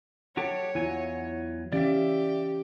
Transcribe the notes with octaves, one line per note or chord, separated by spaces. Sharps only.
F#3 F#4 G4 A4 C#5
E2 F#3 E4 F4 G#5
E3 C#4 G4 D5 E5 F5